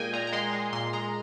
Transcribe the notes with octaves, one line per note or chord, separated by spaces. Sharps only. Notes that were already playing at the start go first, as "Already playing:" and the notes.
Already playing: A#2 G#3 D#5 G5 G#5
A#2 A#5
A#5
G#3 C6
G#3
A#2 C6
G#3 A#5